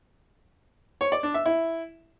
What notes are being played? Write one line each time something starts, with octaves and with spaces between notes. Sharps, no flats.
C#5
D5
D4
E5
E4